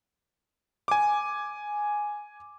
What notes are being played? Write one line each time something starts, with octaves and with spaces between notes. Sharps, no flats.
G#5 D6